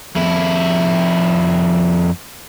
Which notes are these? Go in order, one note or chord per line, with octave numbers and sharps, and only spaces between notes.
F2 E4